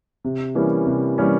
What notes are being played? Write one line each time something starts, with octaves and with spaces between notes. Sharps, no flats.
C3
E3 G3 A#3 C#4
C3
E3 G3 A#3 C#4